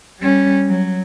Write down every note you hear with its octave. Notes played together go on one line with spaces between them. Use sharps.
G3 C#4
F#3